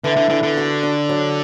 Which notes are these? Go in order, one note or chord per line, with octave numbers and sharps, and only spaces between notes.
D3 E3
D3
E2 D3
D3
F#4
D4
F#3